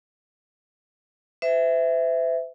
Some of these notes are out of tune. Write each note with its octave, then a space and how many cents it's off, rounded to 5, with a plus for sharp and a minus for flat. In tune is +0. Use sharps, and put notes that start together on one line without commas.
C5 -45 E5 +0